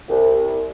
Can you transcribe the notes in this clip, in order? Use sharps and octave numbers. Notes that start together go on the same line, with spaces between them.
C2